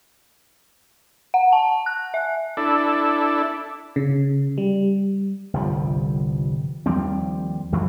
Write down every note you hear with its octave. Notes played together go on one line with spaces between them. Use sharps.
F#5
A5
F#6
E5
D4 E4 A4
C#3
G3
G1 C2 F3 G3
D#2 F3 G3 C4
G#1 F2 E3 F#3